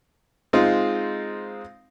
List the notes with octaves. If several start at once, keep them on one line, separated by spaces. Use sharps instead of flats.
G#3 C4 D#4 F4